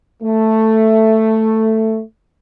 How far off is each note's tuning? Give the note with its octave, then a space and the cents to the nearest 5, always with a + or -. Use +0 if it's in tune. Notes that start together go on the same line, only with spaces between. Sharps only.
A3 +5